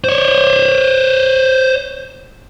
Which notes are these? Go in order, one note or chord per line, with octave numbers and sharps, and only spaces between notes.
C5 C#5